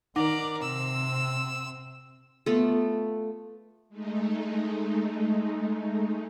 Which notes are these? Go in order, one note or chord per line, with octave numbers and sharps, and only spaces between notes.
D#3 D#4 A#4 D5 F#5 D6 A#6
C3 C4 E6
A3 B3 F4 A4
G#3 A3 D#4